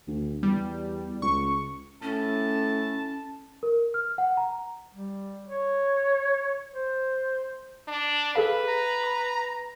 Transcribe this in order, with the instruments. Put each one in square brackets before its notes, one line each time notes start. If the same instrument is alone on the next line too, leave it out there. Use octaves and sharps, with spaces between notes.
[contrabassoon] D2
[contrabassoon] E2 [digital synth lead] G3
[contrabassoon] C#2 [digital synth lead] C#6
[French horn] A2 [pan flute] C#4 [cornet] A5
[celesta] A#4
F6
F#5
A#5
[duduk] G3
C#5
C5
[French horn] D4
[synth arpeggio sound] G#4 A4 F5 [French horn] B4
[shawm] A#5
[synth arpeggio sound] B5